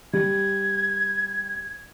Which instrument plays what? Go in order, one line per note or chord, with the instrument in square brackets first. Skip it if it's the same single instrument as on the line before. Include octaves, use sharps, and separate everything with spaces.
[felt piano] G3 [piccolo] G#6